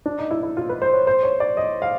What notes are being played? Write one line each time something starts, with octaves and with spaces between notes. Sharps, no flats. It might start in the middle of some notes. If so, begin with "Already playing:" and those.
D4
D#4
E4
E4
F4
B4
C5
C#5
C5
C#5
D5
D#5
F5